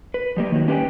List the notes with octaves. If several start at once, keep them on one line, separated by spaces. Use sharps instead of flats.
B4
F3 G3 A#3
D#3 F#3
C#4 G4 B4 F5 G5 G#5